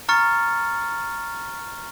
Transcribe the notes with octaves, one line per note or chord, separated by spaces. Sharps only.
A#5 C#6 F6 A6 C#7